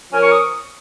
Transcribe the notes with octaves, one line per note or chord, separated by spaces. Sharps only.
F3 C#4 A#4 G#5
C#6
D#6